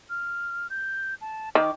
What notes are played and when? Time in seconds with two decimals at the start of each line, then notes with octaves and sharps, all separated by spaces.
0.10 F6
0.70 G6
1.21 A5
1.55 D#3 D6